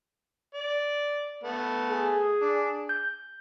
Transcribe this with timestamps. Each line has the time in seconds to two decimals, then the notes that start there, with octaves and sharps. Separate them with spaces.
0.54 D5
1.44 A3 B3
1.89 G#4
2.42 D4
2.89 G6